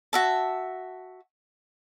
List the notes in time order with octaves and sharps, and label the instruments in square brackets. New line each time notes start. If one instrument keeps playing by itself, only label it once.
[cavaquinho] F#4 E5 A5